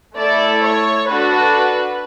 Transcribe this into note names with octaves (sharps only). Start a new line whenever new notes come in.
A3 E4 A4 D5
C#5
D4 F#4 A4 B4